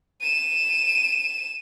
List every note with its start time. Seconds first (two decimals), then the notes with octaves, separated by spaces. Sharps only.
0.21 D#7 E7